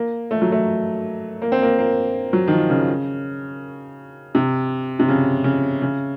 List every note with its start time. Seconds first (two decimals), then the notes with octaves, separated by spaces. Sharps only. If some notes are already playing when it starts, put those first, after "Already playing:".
Already playing: A#3
0.31 A3
0.42 F#3
0.52 A3
1.42 A#3
1.52 C4
1.62 A#3
1.78 A#3
2.33 F#3
2.48 D#3
2.51 F3
2.70 C#3
4.35 C3
4.99 C3
5.09 C#3
5.44 C#3
5.82 C#3